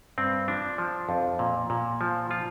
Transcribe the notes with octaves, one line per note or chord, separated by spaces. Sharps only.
G2 C4
F3 D4
F3
F2
A#2
A#2
F3
F3 F4